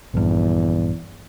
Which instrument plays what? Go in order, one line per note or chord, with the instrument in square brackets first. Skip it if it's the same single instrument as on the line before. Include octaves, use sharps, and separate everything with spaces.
[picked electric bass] A#1 G2 [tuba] E2